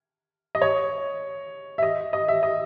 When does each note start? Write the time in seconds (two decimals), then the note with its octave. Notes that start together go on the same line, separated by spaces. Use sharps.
0.55 D#5
0.62 C#5
1.78 E5
1.83 D#5
2.13 D#5
2.28 E5
2.43 D#5